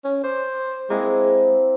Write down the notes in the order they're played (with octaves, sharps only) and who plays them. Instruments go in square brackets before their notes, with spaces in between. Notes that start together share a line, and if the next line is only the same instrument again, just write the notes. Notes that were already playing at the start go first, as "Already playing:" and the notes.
[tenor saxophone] C#4
[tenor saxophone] C5 [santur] D6
[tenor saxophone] G#3 [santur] A#3 C4 E4